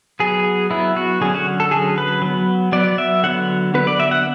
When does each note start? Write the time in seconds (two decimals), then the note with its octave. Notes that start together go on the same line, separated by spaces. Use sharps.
0.20 F#3 B3 G#4
0.71 F#3 B3 E4
0.96 F#4
1.21 D3 F#3 C#4 G#4
1.34 F#4
1.60 A4
1.71 D3 F#3 C#4 G#4
1.98 B4
2.22 F#3 B3
2.72 F#3 B3 D5
2.98 E5
3.23 D3 F#3 B3 F#5
3.74 D3 F#3 B3 B4
3.87 D5
4.00 E5
4.11 F#5